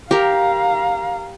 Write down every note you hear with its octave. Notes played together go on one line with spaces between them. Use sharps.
G4 A#4 F5 A#5